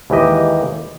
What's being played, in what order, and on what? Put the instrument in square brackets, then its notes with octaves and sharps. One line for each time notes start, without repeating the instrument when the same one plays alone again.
[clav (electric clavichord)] D#2 E3 G#3 G4 D#5